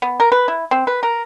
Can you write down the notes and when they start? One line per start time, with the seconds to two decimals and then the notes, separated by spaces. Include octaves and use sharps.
0.02 B3
0.20 A#4
0.32 B4
0.48 E4
0.71 C4
0.87 B4
1.03 A#4